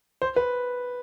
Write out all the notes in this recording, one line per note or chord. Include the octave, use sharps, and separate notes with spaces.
C5
B4